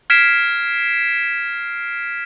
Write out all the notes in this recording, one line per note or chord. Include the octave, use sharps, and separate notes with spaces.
F6 G#6 B6 C7 D7 E7